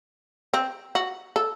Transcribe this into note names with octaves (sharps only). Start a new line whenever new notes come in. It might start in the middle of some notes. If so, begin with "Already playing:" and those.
C4
F#4
A4